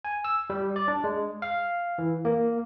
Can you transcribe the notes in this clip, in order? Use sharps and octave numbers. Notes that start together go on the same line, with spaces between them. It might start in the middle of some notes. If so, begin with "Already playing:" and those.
G#5
E6
G3
D5
D4
G#3
F5
E3
A#3